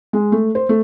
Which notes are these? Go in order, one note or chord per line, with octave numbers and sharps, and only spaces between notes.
G#3
A3
C5
A3